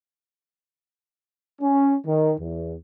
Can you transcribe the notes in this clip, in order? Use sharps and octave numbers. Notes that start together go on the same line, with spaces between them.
C#4
D#3
E2